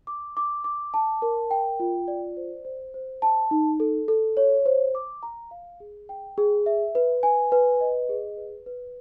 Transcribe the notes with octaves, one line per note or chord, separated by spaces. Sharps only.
D6
D6
D6
A5
A#4
G5
F4
D5
C5
C5
C5
A5
D#4
A4
A4
C#5
C5
D6
A#5
F5
G#4
G5
G#4
E5
B4
G#5
B4
D#5
G#4
B4
B4